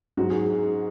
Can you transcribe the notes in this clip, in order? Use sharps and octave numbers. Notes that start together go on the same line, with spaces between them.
G#2 F#3 F#4
G#4